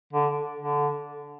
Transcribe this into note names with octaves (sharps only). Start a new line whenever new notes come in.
D3
D3